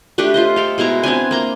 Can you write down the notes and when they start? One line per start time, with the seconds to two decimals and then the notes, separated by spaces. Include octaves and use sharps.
0.18 A3 D4 G4 B4
0.34 F4 C5 D#5
0.56 A4 F5 G5
0.78 B2 G#3 E4 A#5
1.03 B3 C4 D4 G#5
1.31 A#3 A#5 C6